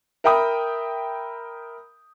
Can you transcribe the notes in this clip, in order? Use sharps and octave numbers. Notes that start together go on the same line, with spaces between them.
A#4 E5 G5 B5 D#6